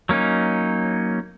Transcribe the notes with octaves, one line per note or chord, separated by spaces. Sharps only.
F#3 A#3 C#4 D#4